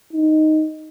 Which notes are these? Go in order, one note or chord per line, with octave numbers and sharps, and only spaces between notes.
D#4